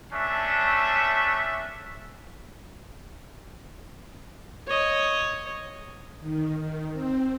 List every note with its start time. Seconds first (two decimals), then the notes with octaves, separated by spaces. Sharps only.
0.13 A3 C#4 D4 E5
4.67 C#5 D#5
6.20 D#3
6.57 D#3
6.93 C4